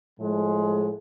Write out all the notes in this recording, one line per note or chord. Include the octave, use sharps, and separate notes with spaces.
A2 F3 G#3